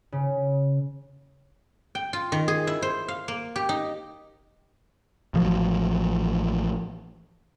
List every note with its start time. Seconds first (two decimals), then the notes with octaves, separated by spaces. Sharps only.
0.12 C#3
1.95 G5
2.13 F4
2.32 D#3
2.48 G#4
2.67 E4
2.82 C5
3.08 F5
3.28 A#3
3.56 G4
3.69 D#4
5.34 A1 F3 F#3